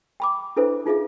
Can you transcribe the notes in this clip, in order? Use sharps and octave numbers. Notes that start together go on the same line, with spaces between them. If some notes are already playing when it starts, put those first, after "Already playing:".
G5 B5 D6
D4 E4 A4 B4 C5 E5
D#4 F4 G#4 E5 F5